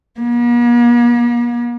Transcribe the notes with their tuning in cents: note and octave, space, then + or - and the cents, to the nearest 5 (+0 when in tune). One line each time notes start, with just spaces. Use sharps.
A#3 +45